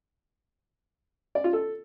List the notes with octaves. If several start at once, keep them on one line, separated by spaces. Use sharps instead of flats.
D5
F4
A4